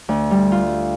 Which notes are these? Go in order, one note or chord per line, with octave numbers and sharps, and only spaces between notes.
D2
G3
F4